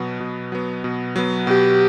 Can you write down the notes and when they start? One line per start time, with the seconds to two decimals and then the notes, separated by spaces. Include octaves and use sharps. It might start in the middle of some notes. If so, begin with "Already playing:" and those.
Already playing: B2 F#3 B3
0.20 B2
0.52 F#3 B3
0.84 B2
1.16 F#3 B3
1.47 B2 G4